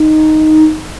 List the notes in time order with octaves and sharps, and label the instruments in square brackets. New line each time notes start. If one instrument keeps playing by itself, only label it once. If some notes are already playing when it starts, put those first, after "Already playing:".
Already playing: [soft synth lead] D#4